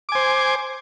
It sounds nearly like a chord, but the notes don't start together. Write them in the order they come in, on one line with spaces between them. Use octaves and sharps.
D6 G#5 C5